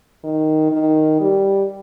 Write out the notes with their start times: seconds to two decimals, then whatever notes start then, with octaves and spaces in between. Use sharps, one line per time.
0.24 D#3
0.72 D#3
1.20 G3